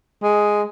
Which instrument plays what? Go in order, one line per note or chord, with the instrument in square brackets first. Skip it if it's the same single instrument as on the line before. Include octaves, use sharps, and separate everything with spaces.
[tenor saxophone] G#3